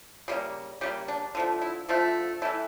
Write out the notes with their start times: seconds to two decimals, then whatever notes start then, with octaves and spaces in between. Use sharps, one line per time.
0.28 C#3 G3 A#3
0.81 C#3 G3 A#3 G4
1.08 D4
1.35 D3 F3 A3
1.61 E4
1.89 D3 F3 A3
2.42 E3 A3 E4